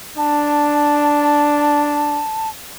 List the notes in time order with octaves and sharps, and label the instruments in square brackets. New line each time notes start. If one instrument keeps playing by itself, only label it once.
[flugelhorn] D4 [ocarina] A5